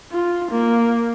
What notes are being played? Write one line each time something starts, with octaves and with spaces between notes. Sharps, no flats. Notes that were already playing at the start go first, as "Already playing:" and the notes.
F4
A#3